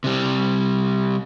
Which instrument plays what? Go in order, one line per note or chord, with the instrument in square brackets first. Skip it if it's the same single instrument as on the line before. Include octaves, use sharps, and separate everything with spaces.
[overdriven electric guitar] C3 G3